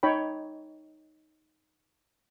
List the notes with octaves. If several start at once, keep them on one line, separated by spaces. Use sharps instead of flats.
D#4 C#5 G5 B5